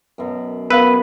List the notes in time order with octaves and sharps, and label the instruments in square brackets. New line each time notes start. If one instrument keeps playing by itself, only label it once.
[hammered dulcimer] F#2 B2
[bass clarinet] B3 [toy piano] A#4 F5 B5 [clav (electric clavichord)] B4